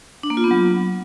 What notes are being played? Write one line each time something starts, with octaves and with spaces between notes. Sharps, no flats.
D4
A#3
F4
B3
F#3